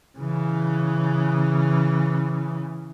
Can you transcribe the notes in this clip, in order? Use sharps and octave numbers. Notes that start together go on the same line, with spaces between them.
C#3 E3